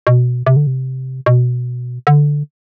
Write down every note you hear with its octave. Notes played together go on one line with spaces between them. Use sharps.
B2
C3
D3
C3
B2
D3